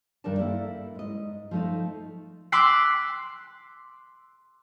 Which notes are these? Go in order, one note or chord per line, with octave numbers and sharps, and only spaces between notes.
G2 D#3 G3 A#4 D5 A5
A#3 E4 A4
G#2 D#5
F3 A3 D#4
C6 D6 E6 F#6 B6 C7